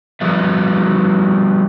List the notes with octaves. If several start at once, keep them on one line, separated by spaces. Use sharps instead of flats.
F3 G3 B3 E5